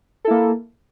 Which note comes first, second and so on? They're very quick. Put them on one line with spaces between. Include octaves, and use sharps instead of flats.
A4 E4 A#3